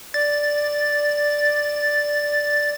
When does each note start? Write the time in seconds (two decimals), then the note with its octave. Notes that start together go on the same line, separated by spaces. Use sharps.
0.14 D5 A6